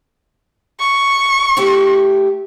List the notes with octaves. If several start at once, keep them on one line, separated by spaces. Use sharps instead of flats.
C#6
A3 E4 G4